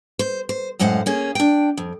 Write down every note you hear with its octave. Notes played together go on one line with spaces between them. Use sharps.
C5
C5
F#2 A2 G#3 C5 F5 F#5
A#3 C#4 G#4
D4 G5
F2